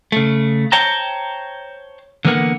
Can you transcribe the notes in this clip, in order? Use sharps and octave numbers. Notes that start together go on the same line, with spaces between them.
C#3 A3
C5 C#5 G5 A5 A#5
D3 E3 A#3 B3 A#4 F#5